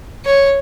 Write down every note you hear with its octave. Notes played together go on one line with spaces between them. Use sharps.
C#5